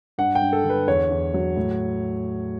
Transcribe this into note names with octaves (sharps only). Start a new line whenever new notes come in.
G2 F#5
G5
G2
A4
D3
B4
E2 C#5
E2
F#3
A2